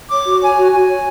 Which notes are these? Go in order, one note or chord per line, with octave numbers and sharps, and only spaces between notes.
C#5 D6
F#4
C#5 G#5
F#4
F#4 G#5
C#5